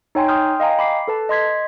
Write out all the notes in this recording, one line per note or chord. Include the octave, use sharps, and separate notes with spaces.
D#4 C#5 G5 G#5 C6
G5 C6 D#6 F6 G6
D#5 F5 G5 G#5 A#5
B5 D6 C7
A4 B4 A5
D#5 C6 G#6 B6